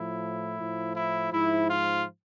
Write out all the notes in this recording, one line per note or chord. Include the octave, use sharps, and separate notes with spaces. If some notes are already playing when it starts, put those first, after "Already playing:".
Already playing: A2 F3 E4
A2 F3
E4
G#2 F3 E4
F4